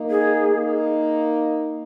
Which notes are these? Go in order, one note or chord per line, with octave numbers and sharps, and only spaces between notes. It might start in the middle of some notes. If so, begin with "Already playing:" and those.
Already playing: A#3 D#4
G#4
A#3 D#4